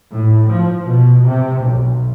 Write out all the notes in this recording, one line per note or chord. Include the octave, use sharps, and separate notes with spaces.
A2
F3
B2
C3
B1